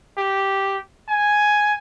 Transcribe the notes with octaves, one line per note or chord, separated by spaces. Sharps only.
G4
G#5